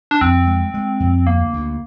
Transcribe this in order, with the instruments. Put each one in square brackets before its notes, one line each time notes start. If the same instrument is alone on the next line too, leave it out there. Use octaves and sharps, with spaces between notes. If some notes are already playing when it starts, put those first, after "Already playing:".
[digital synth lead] D4
[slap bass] F2 [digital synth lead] C4
[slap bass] G#3
G#3
F2
[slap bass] D2 [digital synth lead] A#3
[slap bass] D2